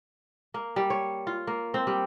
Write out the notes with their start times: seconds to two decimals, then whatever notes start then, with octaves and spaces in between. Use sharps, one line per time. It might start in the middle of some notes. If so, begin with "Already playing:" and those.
0.54 A#3
0.76 G3
0.90 C#5
1.27 F4
1.47 A#3
1.74 C4
1.87 G3